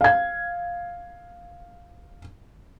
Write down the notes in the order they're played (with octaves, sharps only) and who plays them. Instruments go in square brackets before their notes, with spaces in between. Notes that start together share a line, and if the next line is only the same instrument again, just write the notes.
[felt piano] F5 G#6